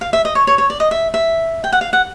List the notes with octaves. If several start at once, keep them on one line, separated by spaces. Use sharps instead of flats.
F5
E5
D#5
C#5
C#5
C#5
D5
D#5
E5
E5
G5
F#5
F5
F#5